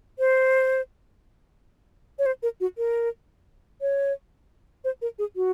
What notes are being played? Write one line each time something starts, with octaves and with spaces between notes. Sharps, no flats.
C5
C#5
C5
A#4
F#4
A#4
C#5
C5
A#4
G#4
F#4